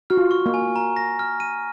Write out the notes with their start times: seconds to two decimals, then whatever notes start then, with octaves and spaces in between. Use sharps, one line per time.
0.10 F#4 F6
0.17 F4
0.31 C#6
0.46 A#3
0.54 G#5
0.76 A#5
0.97 A#6
1.19 F6
1.40 D#7